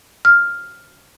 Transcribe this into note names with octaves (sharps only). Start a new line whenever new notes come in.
F6